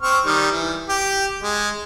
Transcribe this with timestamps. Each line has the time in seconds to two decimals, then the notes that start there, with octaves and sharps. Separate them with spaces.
0.02 C4 C#6 F6
0.25 D#3 G3
0.51 E3
0.89 G4
1.42 G#3